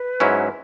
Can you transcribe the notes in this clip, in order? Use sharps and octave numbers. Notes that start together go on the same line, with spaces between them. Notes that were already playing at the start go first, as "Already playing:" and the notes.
Already playing: B4
G#2 F#3 C#4 E4